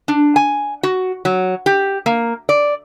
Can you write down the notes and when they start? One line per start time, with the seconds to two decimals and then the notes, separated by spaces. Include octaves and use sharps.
0.08 D4
0.36 G#5
0.83 F#4
1.25 F#3
1.66 G4
2.06 A#3
2.49 D5